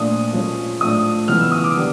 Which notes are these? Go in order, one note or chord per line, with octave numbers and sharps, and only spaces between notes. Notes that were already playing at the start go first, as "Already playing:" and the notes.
Already playing: A#2 F3 A3 D4 D#6
F3 G#3 C#4
A2 F3 A3 D4 D#6
C#3 E3 G#3 B3 F6
E6
D#6
D6
D#3 G3 B3 D4